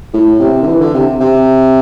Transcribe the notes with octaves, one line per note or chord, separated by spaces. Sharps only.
A2
C3
D3
E3
D3
C3
C3